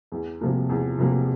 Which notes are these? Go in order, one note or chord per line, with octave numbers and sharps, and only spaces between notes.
E2
C3 F3 A#3
E2
C3 F3 A#3